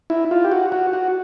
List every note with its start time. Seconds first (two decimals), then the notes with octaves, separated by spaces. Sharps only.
0.10 E4
0.31 F4
0.44 G4
0.51 F#4
0.72 F#4
0.93 F#4